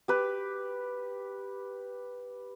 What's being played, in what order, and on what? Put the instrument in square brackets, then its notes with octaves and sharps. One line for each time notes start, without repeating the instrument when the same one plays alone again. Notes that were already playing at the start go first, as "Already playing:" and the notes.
[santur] G4 B4